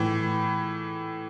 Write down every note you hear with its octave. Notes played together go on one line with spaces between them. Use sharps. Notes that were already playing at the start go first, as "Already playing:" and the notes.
Already playing: A2 E3